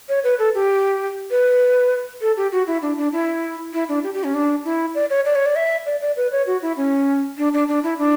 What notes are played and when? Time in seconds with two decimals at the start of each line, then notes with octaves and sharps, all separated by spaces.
0.09 C#5
0.24 B4
0.39 A4
0.55 G4
1.31 B4
2.21 A4
2.37 G4
2.52 F#4
2.67 E4
2.82 D4
2.98 D4
3.13 E4
3.73 E4
3.89 D4
4.04 G4
4.14 G4
4.24 C#4
4.34 D4
4.65 E4
4.95 D5
5.10 C#5
5.25 D5
5.35 C#5
5.46 D5
5.56 E5
5.86 D5
6.01 D5
6.17 B4
6.32 C#5
6.47 F#4
6.62 E4
6.77 C#4
7.38 D4
7.53 D4
7.69 D4
7.83 E4
7.99 D4